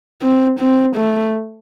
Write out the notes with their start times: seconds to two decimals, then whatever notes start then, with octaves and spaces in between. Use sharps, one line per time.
0.22 C4
0.60 C4
0.96 A3